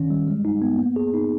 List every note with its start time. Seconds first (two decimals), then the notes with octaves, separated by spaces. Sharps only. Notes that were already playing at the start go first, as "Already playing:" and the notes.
Already playing: D#3 C#4
0.10 G3
0.28 G#3
0.45 D#4
0.62 B3
0.79 A#3
0.96 G#4
1.14 D#4